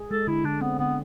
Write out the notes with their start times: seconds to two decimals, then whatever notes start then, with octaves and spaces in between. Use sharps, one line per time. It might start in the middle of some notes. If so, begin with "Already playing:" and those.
Already playing: G#4
0.10 G#3 A4
0.27 D3 E4
0.44 D3 D4
0.61 B3 C4
0.79 D3 B3